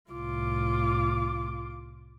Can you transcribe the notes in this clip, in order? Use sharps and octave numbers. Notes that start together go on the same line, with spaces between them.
C2 A2 F4 D6